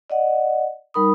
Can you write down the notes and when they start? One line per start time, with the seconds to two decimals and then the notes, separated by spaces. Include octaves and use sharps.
0.10 D5 D#5 F#5
0.94 G3 D#4 A#4 B5 D#6